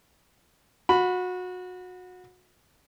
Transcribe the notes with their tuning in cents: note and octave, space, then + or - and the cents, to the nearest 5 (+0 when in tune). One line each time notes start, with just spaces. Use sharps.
F#4 -25 B5 +0